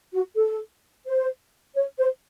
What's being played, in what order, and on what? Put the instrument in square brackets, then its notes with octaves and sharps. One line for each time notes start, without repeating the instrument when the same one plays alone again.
[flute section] F#4
A4
C5
C#5
C5